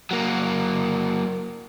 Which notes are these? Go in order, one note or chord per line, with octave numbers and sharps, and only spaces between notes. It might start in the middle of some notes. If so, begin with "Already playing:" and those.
F#3 A#3